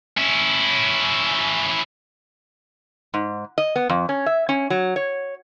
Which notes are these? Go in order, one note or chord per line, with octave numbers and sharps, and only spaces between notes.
C#4 E4
G#2
D#5
B3
F2
C#4
E5
C#4
F#3
C#5